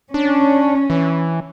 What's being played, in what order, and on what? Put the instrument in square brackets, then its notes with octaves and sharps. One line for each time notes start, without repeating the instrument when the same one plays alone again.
[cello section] C#4 [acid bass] D4
[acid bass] E3